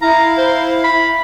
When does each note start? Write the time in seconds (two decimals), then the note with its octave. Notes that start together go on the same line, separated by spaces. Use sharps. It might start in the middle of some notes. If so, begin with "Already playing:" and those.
0.02 E4 F5 A#5
0.38 C5
0.84 B5